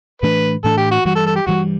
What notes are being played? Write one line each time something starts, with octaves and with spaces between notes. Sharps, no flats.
A2 E3 A3 D4 B4
A2 E3 A3 D4 A4
G4
F#4
G2 E3 G3 F#4
A4
A4
G4
G2 E3 G3 F#4